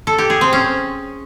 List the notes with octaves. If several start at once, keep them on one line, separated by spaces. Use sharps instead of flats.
A4
G4
G#4
C4
C#4